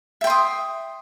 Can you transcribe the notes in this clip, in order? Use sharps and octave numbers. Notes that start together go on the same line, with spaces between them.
E5 G5 C6 D#6